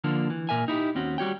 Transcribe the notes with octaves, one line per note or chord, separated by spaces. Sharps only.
D3 F3 A#3 D4
E3
A#2 A#4 E5 G#5
D#4 E4 F#4 G4
D#2 C4 C#4 F#4
G3 F#4 C#5 G5